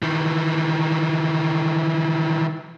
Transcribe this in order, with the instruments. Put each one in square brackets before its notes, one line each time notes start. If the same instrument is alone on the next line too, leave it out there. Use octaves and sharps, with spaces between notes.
[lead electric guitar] D#3 E3